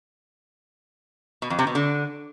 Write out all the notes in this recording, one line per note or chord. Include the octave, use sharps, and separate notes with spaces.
B2
F2
C3
B2
D3